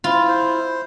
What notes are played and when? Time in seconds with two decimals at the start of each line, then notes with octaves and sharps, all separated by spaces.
0.04 E4 F4
0.28 C5